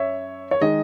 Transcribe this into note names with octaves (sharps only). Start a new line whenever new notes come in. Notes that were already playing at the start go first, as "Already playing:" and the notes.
Already playing: F#2 C#5 E5
C#5
D#3 G#3 D#4 D#5